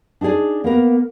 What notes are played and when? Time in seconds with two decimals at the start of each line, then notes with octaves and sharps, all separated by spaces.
0.21 D4 D#4 F#4 G#4 D5
0.64 A#3 B3 A#4 B4